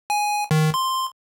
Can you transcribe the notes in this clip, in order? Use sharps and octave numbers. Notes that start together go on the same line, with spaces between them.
G#5
D#3
C6